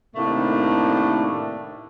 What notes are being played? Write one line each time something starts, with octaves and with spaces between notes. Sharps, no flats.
A2 C3 D#3 A3 A#3 D4